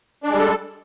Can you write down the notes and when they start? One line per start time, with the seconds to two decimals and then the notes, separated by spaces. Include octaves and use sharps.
0.23 D4
0.28 G#3
0.33 G3
0.38 A4